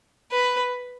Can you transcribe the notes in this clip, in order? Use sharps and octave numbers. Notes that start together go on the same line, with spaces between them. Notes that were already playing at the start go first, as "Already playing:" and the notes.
B4